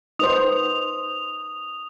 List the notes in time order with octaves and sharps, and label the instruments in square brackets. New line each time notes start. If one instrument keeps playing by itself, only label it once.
[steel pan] D#4 B4 C5 [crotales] D#6 F7